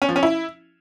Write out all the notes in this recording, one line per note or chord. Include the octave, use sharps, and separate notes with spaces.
C#4
F3
C#4
E4